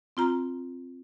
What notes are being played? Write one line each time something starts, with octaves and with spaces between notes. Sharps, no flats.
C4 F4 A#5